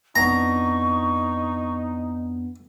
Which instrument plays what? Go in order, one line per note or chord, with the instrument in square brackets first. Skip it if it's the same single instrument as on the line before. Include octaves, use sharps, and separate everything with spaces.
[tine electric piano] F2 B3 D4 [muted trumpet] D#4 [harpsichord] A#5 [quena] C#6